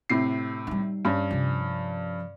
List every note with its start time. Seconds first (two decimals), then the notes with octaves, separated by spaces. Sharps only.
0.09 A2 C3 C7
0.67 G3 D#4
1.05 G2 C#4
1.31 C3 F3